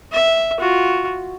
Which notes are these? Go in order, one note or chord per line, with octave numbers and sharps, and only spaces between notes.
E5
F4 F#4